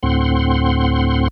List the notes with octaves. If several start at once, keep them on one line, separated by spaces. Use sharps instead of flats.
D2 A2 C4 F#5 C6